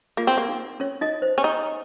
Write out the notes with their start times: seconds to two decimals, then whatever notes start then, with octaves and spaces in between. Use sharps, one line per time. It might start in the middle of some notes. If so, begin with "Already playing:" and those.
0.17 A#3 F4
0.27 C4
0.38 A#3
0.48 D#4
0.80 C#4 C#5
1.01 D#4 D#5
1.22 C5
1.38 C#4
1.44 D#4